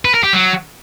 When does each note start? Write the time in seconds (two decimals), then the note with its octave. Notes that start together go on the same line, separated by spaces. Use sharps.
0.05 B4
0.14 A#4
0.24 G4
0.33 F#3